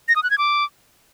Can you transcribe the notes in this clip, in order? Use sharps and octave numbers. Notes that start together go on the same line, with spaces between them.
A#6
D#6
F#6
G#6
D6